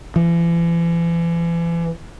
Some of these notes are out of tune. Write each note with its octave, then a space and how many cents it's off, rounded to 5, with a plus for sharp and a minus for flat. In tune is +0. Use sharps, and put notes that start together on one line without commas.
E3 +40